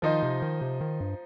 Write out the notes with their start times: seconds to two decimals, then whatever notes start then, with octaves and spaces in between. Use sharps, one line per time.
0.02 D#3 F3 D#4 C5 D#5
0.23 C3
0.42 D#3
0.61 C3
0.81 D#3
1.01 G2